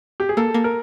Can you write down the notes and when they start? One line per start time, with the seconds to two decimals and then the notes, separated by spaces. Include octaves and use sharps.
0.20 G4
0.29 G#4
0.37 A#3 A4
0.54 A#3
0.64 A#4